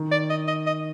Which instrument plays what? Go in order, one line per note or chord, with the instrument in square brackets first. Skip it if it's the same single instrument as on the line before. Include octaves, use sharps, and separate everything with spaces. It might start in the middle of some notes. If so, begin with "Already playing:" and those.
Already playing: [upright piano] D#3
[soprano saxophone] D5
D#5
D#5
D#5